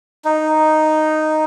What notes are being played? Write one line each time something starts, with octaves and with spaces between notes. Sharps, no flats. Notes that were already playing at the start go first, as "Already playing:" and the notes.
D#4